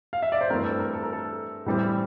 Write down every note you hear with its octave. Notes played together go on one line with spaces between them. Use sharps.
F5
E5
D5
C5
G2 E3 A3 C4 A#4
A4
A#4
A4
A#4
A4
A2 E3 G3 C4